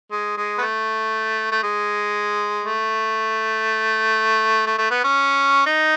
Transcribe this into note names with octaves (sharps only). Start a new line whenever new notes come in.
G#3
G#3
B3
A3
A3
G#3
A3
A3
A3
B3
C#4
D#4